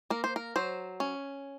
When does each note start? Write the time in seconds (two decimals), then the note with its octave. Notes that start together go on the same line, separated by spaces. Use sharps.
0.10 A#3 A#4
0.24 C5
0.36 A#4
0.56 F#3 C5
1.00 C#4